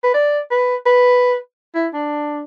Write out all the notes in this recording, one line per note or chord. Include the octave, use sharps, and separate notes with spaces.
B4
D5
B4
B4
E4
D4